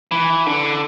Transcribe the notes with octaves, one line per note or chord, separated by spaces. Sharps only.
E3
D3